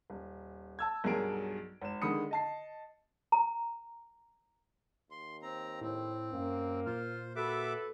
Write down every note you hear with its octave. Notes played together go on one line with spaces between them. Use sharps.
D#1
A5 E6 G#6
B1 G2 F#3 G#4 A#4 D7
G#1 E7
D3 D#3 G#3 B5 D#6 C#7
D#5 A5 C7
A#5
D#2 C6
C4 A#5
A2 C4
F#2 A#3
A#2 F4 C5 F6
F#4 A4 B4 E5 D6